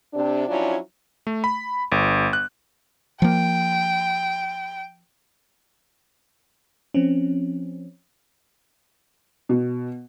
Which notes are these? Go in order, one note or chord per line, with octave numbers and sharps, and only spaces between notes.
C3 D4
F3 F#3 C#4 D4 E4 F4
A3
B5
G1
F#6
F3 A#3 G5
F3 C4 C#4
B2